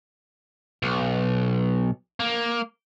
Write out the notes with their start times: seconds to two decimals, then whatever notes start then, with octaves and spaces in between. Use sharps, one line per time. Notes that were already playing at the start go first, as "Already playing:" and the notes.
0.83 B1
2.20 A#3